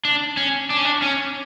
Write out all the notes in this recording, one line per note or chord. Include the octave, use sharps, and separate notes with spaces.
D4
C#4
D4
C#4
D4
C#4